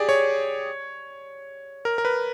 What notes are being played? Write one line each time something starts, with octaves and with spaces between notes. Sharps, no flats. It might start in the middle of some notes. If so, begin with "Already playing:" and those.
Already playing: G4 G#4 D5
C#5
A#4
A#4
B4